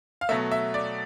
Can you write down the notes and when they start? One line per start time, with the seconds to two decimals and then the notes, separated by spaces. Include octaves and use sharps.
0.21 F5
0.29 B2 F#3 A3 E5
0.51 E5
0.74 D5